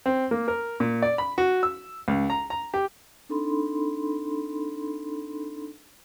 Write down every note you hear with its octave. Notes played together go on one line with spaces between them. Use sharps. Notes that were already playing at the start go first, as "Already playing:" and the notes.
C4
A#3
A#4
A#2
D5
B5
F#4
E6
C#2
A#5
A#5
G4
C4 D4 D#4 A4 B5 C6